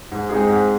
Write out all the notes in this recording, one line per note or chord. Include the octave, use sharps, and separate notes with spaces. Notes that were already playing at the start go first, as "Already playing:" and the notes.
G#2
G#3 C4 D#4 G#4
G#2